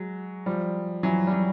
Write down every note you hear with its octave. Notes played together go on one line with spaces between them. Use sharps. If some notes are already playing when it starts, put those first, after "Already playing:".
Already playing: F#3 G#3
F3 G3
E3 F#3
G3
E3 F#3